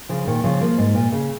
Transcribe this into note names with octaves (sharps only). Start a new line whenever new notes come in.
C#3 F3
A#2 D#3
C#3 F3
F3 A#3
G#2
A#2
C#3